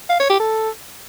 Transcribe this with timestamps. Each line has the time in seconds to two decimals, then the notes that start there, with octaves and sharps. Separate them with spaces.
0.10 F5
0.20 C#5
0.30 G4
0.40 A4